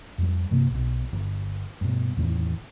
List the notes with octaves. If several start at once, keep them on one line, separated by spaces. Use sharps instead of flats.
F2 G3
G2 C3 A#3
B1 B2
G1
G2 B2
E2 A2 D#3 E3